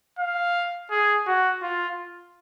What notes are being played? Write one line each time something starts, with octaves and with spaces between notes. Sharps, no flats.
F5
G#4
F#4
F4